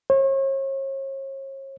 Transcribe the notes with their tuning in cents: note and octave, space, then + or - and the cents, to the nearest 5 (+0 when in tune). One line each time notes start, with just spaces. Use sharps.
C#5 -40